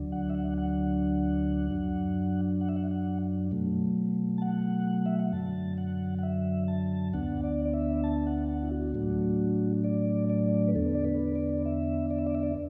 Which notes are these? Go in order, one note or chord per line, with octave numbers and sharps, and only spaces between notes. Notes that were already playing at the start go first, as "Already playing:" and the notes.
Already playing: D2 D3 F#3 D4
F#5
E5
F#5
F#5
F#2 F#3 D4
F#5
E5
F#5
F#5
B2 F#3 A3
A5
F#5
E5
F#5
F#2 D3 F#3 A5
F#5
F#5
E5
A5
D2 D3 B3 D4 F#5
D5
D5
E5
A5
F#5
F#5
E4
F#4
A2 F#3 A3 D4
D5
D5
B4
E2 D3 B3 D4 A4
D5
B4
D5
E5
D5
E5
D5
E5
D5